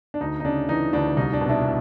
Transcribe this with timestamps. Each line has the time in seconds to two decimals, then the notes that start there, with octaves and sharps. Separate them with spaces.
0.14 D4
0.21 D2 D#4
0.40 D#4
0.45 C#3 D4
0.69 E3 D#4
0.93 D2 D4
1.17 C2 D#4
1.33 D4
1.41 B2
1.49 D4 E4
1.65 B2